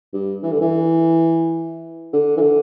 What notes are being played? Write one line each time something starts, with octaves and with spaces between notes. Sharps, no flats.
G2
E3
D3
E3
D3
E3
D3